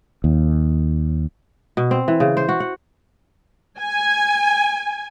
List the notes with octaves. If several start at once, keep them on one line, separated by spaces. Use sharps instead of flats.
D#2
B2
C4
E3
C#3
C5
F#4
F#5
G#5